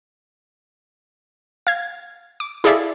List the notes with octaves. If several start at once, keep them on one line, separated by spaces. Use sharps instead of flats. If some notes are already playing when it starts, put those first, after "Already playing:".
F5 G#6
D6
E4 G#4 A4 D5 E5 F5